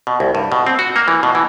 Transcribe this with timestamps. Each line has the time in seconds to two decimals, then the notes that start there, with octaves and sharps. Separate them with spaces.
0.07 B2
0.20 C2
0.35 G2
0.52 B2
0.67 C4
0.79 F#4
0.96 A#3
1.08 E3
1.23 B2
1.35 E3